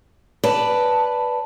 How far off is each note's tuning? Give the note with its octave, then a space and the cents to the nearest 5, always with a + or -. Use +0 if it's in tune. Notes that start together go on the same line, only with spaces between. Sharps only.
B4 +0 D5 +0 A5 +0